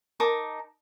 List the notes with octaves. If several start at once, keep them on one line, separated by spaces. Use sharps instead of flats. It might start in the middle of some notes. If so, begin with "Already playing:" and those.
D#4 A#4 A5 D6